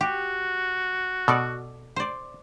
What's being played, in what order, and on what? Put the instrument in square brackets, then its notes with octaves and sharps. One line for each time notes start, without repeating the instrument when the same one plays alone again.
[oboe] F#4 [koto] G4
[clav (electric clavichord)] B2 [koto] A4 D5
[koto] C5 D5